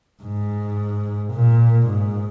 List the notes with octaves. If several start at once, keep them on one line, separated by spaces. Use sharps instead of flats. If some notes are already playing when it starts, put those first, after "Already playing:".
G#2
A#2
G#2